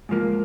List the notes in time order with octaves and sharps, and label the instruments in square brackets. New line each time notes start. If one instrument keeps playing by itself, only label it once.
[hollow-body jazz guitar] G#2 F3 A#3